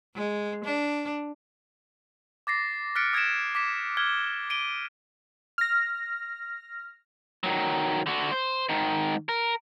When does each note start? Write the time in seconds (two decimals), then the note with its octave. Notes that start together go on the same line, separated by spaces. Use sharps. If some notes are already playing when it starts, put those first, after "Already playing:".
0.15 G#3
0.64 D4
2.47 D6 A6 A#6 C7
2.95 F6 F#6 A6 B6 C#7 D7
3.13 D#6 G#6 A#6 D7 E7
3.55 D6 B6 E7
3.97 F6 F#6 G#6 G7
4.50 D7 D#7 G7
5.58 F6 A#6
7.44 D#3 F#3
8.07 D3 F#4
8.31 C5
8.69 G#2 D#3
9.29 A#4